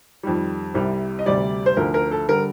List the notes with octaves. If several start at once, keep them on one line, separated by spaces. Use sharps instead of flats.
F2 D#3 G3
C2 C3 G3
D#5
D2 C3 G3 D5
C5
D2 D3 F3 A#4
A#4
A4
D3 G3 A#4